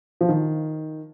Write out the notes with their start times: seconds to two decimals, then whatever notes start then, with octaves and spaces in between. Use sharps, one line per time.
0.21 F3
0.29 D#3